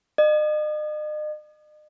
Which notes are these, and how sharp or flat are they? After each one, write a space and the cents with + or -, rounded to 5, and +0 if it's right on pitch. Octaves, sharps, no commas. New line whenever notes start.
D#5 -40